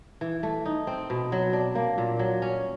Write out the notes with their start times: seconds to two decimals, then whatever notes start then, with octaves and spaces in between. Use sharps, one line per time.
0.21 E3
0.43 A3
0.66 D#4
0.87 C4
1.10 B2
1.32 F#3
1.53 D4
1.75 A#3
1.98 A#2
2.19 F#3
2.42 C#4